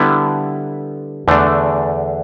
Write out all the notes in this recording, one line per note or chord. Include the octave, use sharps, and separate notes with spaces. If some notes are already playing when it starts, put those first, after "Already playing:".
Already playing: D3 G3 B3 E4
E2 D3 A3 D4